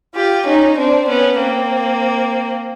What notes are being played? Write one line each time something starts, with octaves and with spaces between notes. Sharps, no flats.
F4 G4
C#4 D#4
C4 D4
B3 C#4
A#3 C4